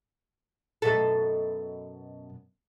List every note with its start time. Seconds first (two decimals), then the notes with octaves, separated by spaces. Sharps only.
0.82 F#2 B2 A4